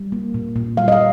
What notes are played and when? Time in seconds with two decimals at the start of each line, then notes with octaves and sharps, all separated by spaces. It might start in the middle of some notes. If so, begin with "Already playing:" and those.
Already playing: G3
0.12 A#3
0.34 A#2
0.56 A#2
0.77 G3 F5
0.88 D#5
0.92 F5